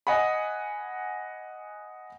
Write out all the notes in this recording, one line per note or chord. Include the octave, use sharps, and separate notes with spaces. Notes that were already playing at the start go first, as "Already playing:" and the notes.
D#5 F#5 G#5 B5